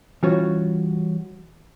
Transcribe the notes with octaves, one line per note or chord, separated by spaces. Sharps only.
E3 G3 C#4 F4 F#4 C#5